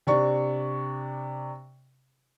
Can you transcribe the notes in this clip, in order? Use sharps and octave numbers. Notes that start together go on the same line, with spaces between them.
C3 D4 C#6